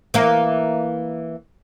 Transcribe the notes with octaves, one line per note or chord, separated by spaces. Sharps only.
E3 A#3